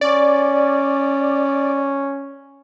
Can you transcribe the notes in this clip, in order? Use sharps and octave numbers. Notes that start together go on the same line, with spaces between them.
C#4 D5